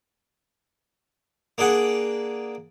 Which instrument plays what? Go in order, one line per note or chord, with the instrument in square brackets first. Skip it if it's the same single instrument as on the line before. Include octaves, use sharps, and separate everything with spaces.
[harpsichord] A#3 D4 G#4 F#5